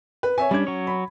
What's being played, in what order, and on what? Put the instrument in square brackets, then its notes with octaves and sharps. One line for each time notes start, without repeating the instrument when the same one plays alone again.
[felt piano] B4
C#5 E5 G#5
[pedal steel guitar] G3 D4 [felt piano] C#4 G#6
[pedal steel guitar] F#3 C#5
[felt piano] B5